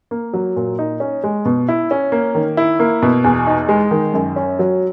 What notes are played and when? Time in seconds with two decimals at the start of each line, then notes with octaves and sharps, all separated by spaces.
0.11 A#3
0.34 F#3
0.56 A#2
0.79 D#4
1.00 C#4
1.24 G#3
1.45 B2
1.68 E4
1.91 C#4
2.12 A#3
2.35 D#3
2.57 E4
2.80 A#3
3.02 B2
3.24 E2
3.47 D#4
3.69 G#3
3.91 D#3
4.14 F#2
4.36 C#4
4.59 F#3